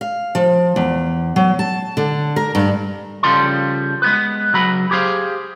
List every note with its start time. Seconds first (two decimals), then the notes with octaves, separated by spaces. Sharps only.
0.01 F5
0.35 F3
0.76 E2
1.36 F#3
1.59 A5
1.97 D3
2.36 A#4
2.55 G2
3.23 C#3 F3 G3 A4 C6
4.02 G#3 B3 B4
4.53 C#2 F#3 B5
4.91 G4 G#4 C5 F5